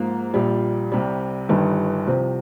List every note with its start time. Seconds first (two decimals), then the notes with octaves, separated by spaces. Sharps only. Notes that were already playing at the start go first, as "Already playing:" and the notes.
Already playing: G#2 F3 A#3
0.34 A#1 A#2 G3
0.92 C2 C3 G3
1.49 G1 G2 D#3 G3
2.07 C2 C3 F3 C4